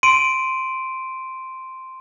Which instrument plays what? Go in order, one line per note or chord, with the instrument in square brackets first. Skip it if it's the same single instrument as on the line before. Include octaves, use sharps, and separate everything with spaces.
[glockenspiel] C6 D7 D#7